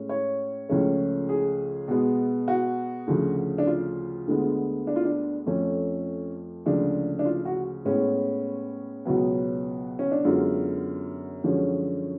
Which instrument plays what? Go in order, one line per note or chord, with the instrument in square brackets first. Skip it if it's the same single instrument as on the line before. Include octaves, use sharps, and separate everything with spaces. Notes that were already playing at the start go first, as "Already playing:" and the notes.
Already playing: [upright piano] A2 G#3 C#4
C#5
C#2 C#3 F3 A3 C#4
G#4
B2 G#3 B3
F#4
D2 C#3 F3
D4
F4
D2 D3 G#3 B3
D4
F4
D4
F2 F3 A3 C#4
D2 C#3 F3 G#3 D4
D4
F4
F#4
A2 G#3 B3 C#4
C#2 B2 F#3 B3
C#4
D4
F#2 D3 G#3 B3 F4
F#2 D3 F3 G#3 C#4